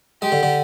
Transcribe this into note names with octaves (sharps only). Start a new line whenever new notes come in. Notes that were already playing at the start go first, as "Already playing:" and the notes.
G#3 G4
D3
D3